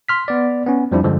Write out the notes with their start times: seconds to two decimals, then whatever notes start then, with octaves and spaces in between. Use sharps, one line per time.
0.09 C6 F6 B6
0.28 B3 D5
0.66 B3 C#4
0.91 F2 F3 G3 C4 D4 E4
1.04 G2 D3 F3 G#3